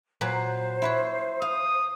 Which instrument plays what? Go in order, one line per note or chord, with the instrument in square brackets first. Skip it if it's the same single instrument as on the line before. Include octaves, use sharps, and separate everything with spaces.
[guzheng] A#2 F#3 B4 [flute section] C5
[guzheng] E4 B4 C#5
[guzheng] F5 [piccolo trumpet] D#6